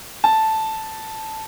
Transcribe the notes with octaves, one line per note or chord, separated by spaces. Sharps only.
A5